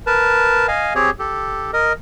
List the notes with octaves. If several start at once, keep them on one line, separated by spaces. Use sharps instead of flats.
A#4 B4 A5
D#5 F5 G#5
C4 G4 G#4 C#5
G4 A4
A#4 D#5